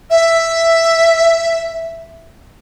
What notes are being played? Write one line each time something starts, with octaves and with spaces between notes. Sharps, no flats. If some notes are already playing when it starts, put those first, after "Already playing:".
E5